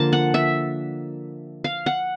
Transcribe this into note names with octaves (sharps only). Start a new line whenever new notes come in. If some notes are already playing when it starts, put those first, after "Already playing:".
Already playing: D3 F3 A#3 A5
F#5
E5
F5
F#5